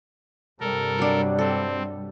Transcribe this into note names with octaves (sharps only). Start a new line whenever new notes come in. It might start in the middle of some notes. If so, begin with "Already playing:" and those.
G2 C3 G3 A4 A#4
F#3 D4
C4 A4